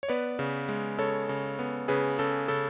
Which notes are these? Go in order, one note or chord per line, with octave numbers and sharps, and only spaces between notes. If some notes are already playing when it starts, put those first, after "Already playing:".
C#5
B3 B4 D5
C#3
G#3
C#3 A4 C#5
C#3
B3
C#3 G#4 B4
C#3 A4
C#3 A4